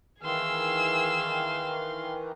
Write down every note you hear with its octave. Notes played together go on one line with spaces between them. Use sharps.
D#3 E3 G#4 F5 C6 E6